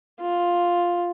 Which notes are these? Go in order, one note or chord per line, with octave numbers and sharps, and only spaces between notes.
F4